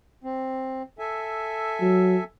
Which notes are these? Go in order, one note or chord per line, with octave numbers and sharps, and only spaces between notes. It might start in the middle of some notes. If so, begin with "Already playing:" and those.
C4
A4 E5 G#5
F#3